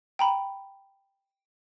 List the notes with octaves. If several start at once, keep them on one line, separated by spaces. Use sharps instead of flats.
G5 A#5 B5